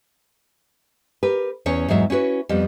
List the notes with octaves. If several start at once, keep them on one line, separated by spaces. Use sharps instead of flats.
G4 A#4 B4
E2 C#4 C#5
E2 G#2 F#3 E5
C#4 E4 F#4 B4
F2 G3 B3